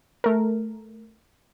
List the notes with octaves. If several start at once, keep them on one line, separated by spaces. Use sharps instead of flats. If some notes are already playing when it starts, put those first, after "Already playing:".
A3 A#4